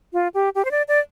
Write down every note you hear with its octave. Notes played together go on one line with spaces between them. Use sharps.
F4
G4
G4
C5
D5
D5